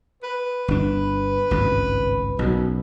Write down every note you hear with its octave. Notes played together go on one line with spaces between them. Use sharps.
B4
G1 D4
G#1 C#2 G2
B1 F#2 B2